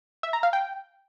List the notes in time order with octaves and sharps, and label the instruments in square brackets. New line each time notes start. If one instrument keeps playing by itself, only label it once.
[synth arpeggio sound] E5
A#5
F5
G5